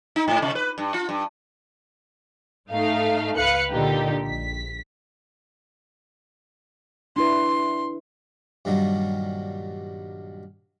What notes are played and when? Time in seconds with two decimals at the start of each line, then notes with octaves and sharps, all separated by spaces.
0.16 D#4
0.28 G#2
0.42 C3
0.55 B4
0.78 G2
0.94 F4
1.09 G2
2.71 G#2 A3 D#4 F5
3.37 C#2 B4 F5 F#6 C#7
3.71 A#2 D3 D#4 G4
4.23 A#1 B6
7.16 D4 E4 B4 C6
8.65 G2 A#2 D#3 F#3 G3